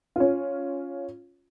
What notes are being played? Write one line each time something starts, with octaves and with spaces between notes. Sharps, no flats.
C#4 F4